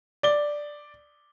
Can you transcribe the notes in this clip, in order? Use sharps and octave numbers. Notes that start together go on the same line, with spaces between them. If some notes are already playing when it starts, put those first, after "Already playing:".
D5 G7